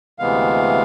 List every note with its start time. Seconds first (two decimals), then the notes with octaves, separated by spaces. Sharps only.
0.19 D2 C3 E3 G#3 B3 F5